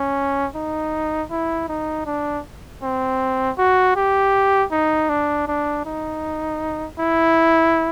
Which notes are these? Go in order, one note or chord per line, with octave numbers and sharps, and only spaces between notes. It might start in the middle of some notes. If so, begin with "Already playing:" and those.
Already playing: C#4
D#4
E4
D#4
D4
C4
F#4
G4
D#4
D4
D4
D#4
E4